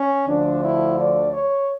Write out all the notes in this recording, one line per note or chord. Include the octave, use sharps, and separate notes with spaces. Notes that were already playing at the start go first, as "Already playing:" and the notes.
Already playing: C#4
D2 D3 F3 D4
E4
D5
C#5